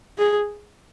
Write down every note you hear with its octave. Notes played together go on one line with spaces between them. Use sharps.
G#4